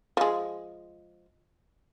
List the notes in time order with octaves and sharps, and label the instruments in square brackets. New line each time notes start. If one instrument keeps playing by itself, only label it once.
[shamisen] F3 G#3